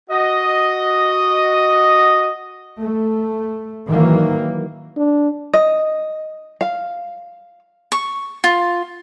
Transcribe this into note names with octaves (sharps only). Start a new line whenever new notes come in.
F#4 D#5
A3
D#3 E3 F#3 A#3
D4
D#5
F5
C#6
F4